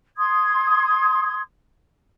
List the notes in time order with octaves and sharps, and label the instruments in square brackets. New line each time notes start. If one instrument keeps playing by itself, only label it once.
[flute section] C6 D#6 G#6